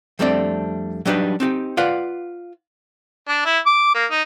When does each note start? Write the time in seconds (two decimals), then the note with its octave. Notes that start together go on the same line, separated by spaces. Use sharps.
0.19 F2 G3 A3 C4 D4 D5
1.05 F#3 G3 D4 D#4 B4
1.40 C4 D#4 F#4 G4
1.77 F4 B4 D5 F5 F#5
3.28 D4
3.45 E4
3.66 D6
3.94 A#3
4.11 D#4